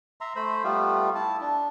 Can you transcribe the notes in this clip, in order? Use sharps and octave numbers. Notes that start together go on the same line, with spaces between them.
E5 A#5 C6
A3 C5 B5
G3 A3 B3 F4
E4 A5
D4